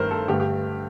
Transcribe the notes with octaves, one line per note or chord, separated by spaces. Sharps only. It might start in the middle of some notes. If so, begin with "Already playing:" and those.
Already playing: G2 D#3 A3 A#4 C5
A4
G2 D3 A3 G4
G4